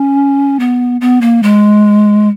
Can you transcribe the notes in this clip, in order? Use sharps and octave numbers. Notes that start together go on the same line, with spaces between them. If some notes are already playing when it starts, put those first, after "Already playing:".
Already playing: C#4
B3
B3
A#3
G#3